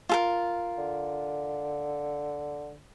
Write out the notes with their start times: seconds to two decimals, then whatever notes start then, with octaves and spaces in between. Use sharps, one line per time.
0.09 F4 A4 A#4
0.78 D3